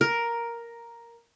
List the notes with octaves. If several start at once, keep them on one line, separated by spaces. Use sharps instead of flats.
A#4